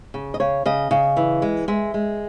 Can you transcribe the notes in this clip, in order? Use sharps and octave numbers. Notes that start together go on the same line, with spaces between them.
C#3
D#5
C#3 C#5
C#3 D#5
C#3
E3
G#3
G#3 E5
G#3